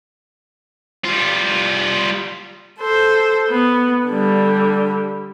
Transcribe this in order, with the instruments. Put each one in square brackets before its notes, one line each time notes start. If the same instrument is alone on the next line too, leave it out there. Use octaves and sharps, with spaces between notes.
[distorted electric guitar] G3 F4
[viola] A4 C5
B3
D3 G3